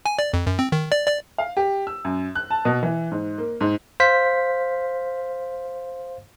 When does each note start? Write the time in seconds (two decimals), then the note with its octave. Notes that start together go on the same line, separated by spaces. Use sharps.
0.06 G#5
0.19 D5
0.33 F2
0.47 F#2
0.59 C4
0.72 D#3
0.92 D5
1.07 D5
1.38 F5
1.57 G4
1.87 E6
2.05 F#2
2.35 F#6
2.50 A5
2.65 B2
2.83 E3
3.12 G#2
3.38 A#3
3.61 G#2
4.00 C5 F5 B6